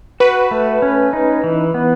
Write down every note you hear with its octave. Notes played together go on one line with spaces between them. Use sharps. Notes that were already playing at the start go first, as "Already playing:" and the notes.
F#4 B4
A3
C#4
D#4
E3
B3